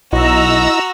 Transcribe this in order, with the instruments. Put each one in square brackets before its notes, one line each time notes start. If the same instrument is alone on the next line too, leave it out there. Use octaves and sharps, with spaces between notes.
[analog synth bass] B1 [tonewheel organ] E4 D#5 [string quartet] F#4 [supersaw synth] A#5 E6